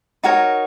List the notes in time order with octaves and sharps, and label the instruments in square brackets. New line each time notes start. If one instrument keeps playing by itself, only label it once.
[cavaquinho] D#4 F#4 A#4 C#5